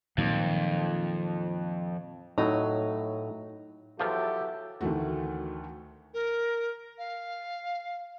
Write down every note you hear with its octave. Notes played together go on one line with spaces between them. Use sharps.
F2 A#2 D#3 F#3
A2 F#3 D#4
E2 F3 F#3 E4 F4 G4 A4
D2 D#3 E3 A3 F#4
A#4
F5